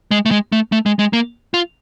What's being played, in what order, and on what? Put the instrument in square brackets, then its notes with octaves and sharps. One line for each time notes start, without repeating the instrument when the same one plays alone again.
[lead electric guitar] G#3
A3
G#3
A3
A3
G#3
G#3
A#3
F4